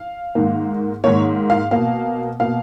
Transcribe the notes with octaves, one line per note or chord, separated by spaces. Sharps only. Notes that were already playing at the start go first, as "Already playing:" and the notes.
Already playing: F5
G#2 D#3 A#3
G#2 D#3 A#3 C#5
F5
B2 A#3 F5
B2 A#3 F5